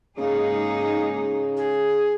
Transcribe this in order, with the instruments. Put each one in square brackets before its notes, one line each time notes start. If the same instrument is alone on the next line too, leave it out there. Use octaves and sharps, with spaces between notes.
[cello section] G#2 D#4 G#4 [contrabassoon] C#3 [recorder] A#3
[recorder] G#4